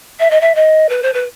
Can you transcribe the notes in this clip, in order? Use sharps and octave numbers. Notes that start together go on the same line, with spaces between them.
E5
D#5
E5
D#5
B4
C5
B4